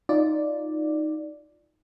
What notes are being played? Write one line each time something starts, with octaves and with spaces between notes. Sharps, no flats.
D#4 F4 D5